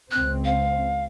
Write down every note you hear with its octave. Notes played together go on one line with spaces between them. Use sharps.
C#2 C4 F#6
F5